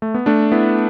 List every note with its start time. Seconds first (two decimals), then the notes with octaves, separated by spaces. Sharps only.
0.02 A3
0.14 B3
0.26 A3 D4
0.52 B3 E4